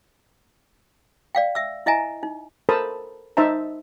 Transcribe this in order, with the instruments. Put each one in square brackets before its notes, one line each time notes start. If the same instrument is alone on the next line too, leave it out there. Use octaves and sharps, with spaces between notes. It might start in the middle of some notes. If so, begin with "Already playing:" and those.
[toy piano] D5 F5 G5
E5 E6
E4 D#5 E5 G#5 A#5
D#4
[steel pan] A4 A#4 C5 A5 B5 D#6
D#4 C5 E5 A5 A#5